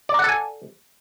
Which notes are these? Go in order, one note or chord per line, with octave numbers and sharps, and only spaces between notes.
A4 D5 F#5 G#5 A#5